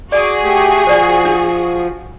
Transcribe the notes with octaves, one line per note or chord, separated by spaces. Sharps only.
F#4 G#4 D5 D6
A3 G4
F3 C5 D5 G#5
D4